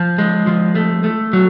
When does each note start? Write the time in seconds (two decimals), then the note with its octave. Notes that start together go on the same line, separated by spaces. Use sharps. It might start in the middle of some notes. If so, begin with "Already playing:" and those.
Already playing: F3
0.18 G#3
0.47 F3
0.75 A3
1.04 A3
1.33 F#3